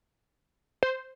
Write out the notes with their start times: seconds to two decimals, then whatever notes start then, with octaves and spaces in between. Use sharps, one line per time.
0.83 C5